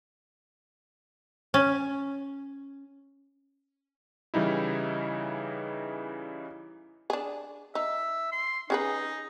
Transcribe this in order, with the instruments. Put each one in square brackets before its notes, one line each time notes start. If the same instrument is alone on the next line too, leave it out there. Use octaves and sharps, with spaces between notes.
[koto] C#4
[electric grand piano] C#3 E3 G3 D#4 E4
[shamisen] D4 G#4
[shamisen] D#4 [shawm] E5
[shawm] C6
[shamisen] C#4 G#4 B4 [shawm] D#4